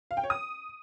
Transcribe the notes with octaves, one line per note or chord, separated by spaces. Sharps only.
F5
G5
C#5
D#6